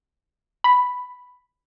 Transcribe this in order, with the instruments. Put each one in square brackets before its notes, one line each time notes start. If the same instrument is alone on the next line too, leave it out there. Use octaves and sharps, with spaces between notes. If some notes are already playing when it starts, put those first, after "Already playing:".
[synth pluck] B5